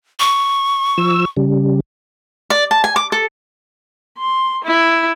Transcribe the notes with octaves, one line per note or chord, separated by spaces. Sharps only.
C#6
F3 E6
C#3 G3
D5
A5
G#5
D6
A4
C6
E4